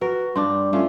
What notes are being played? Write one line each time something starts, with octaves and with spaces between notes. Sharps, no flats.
F#4 A#4 B4
G2 G3 D4 C6 D6
A3 C#4 F4